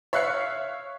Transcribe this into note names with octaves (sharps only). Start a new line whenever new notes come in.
C#5 E5 F5 F#6 C7 C#7